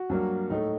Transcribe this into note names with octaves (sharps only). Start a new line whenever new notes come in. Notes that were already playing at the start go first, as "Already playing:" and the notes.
Already playing: F#4
G2 F#3 A#3
A2 A3 D#4